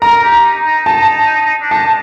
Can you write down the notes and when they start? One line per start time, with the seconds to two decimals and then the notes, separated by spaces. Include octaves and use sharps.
0.02 A#4 A#5
0.23 G4
0.44 D#4
0.66 D#4
0.86 D#4 A5
1.61 D4
1.71 D#4 A5